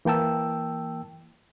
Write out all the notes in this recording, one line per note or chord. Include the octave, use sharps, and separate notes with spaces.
E3 A#3 G5 A5 E6